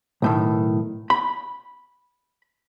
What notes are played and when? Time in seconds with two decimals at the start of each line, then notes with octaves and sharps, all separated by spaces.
0.22 B1 A2 D#3
1.10 B5